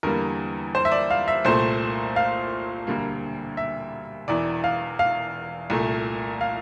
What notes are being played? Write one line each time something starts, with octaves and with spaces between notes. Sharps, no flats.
E2 D3 G3 A#3 A#4
C5
E5
D5
F5
E5
C2 A#2 A3 C5
F5
E1 D2 D3 G3 A#3
E5
E1 E2 E3 D5
F5
F5
C2 A#2 A3
F5